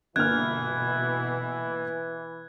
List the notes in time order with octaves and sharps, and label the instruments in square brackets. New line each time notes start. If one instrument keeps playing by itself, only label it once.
[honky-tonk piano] G1 A#3 F6 [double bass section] B2 [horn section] E3 [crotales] F#6 G#6